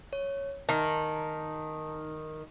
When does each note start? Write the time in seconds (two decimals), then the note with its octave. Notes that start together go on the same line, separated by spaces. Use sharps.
0.13 C#5
0.69 D#3 A5 A#5